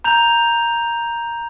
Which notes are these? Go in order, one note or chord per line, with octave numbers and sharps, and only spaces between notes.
A#5 G6 F7